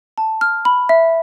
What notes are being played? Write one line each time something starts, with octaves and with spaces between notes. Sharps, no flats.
A5
F6
B5
E5